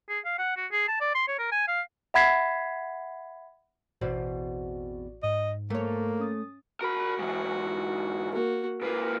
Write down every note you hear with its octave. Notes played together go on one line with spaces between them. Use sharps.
G#4
F5
F#5
F#4
G#4
A5
D5
C6
C#5
A#4
G#5
F5
E5 F#5 B5 G#6 B6 C7
A1 E2 B2 C4 F#4 D5
G#2 D#5
A3 A#3 C#5
C#4 D#6 A6
F#4 A#4 B5
G#2 E3
A#3 F#4
G#2 A#3 B4